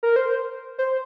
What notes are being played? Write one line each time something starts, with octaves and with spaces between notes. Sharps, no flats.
A#4
C5
C5